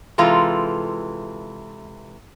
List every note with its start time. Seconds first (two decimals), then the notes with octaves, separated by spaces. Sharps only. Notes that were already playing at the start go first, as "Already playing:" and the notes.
0.18 C3 E3 G#3 F4 A4 A#5